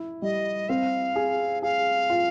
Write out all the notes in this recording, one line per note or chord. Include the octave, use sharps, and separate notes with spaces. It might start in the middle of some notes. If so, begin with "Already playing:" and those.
Already playing: E4
G3 D#5
C4 F5
G#4
G#4 F5
F4